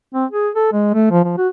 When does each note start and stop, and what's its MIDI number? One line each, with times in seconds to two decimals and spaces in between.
0.14 0.26 60
0.31 0.49 68
0.55 0.72 69
0.72 0.91 56
0.94 1.06 57
1.11 1.23 53
1.24 1.34 53
1.37 1.48 66